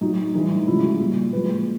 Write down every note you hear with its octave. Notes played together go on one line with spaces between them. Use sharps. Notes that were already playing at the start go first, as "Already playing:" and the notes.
A2 F#3 D#4
A2 E3 G3 D#4
C#3 F3 G#3 E4
F#4
A#2 G3
A#2 F3 G#3 B4